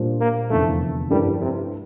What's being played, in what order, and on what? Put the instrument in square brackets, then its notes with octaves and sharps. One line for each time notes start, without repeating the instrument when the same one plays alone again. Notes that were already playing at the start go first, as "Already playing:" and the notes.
Already playing: [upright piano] A#2 G3 D4 F4 C5
[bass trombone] A#3
[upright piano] F1 E2 D3 F3 [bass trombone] A3
[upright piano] G2 F3 A3 E4 A#4 [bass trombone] G3
[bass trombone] C3